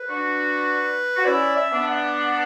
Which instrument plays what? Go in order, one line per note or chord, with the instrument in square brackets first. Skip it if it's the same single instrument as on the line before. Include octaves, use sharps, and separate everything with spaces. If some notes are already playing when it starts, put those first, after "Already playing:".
Already playing: [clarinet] B4
[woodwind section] D4 F#4
F#4
[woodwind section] C#4 E4 [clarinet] D5
[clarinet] E5
[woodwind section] B3 D4
[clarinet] F#5